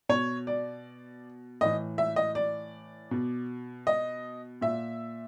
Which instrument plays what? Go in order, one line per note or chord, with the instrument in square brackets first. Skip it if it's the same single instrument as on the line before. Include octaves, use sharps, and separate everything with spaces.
[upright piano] B2 C#5
D5
A2 E3 D#5
E5
D#5
D5
B2
D#5
A#2 E5